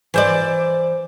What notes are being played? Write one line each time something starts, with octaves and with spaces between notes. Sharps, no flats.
E3 C5 D5